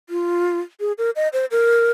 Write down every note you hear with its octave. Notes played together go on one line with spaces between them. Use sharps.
F4
G#4
A#4
D#5
C5
A#4